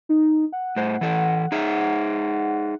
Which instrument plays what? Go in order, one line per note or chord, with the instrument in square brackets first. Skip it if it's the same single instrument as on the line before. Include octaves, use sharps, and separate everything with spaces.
[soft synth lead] D#4
F#5
[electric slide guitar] A2 C5 [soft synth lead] F#5
[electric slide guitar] E3 A4
D#4 G#4 E5